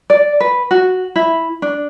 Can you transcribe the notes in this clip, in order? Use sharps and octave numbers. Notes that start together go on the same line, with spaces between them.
D5
B4
F#4
E4
D4